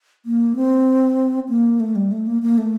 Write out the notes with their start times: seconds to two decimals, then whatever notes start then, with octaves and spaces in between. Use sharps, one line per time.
0.26 A#3
0.56 C4
1.49 A#3
1.80 A3
1.96 G3
2.12 A3
2.27 A#3
2.42 A#3
2.58 A3